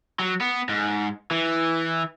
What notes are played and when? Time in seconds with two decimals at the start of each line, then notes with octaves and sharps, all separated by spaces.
0.19 F#3
0.41 B3
0.69 G#2
1.31 E3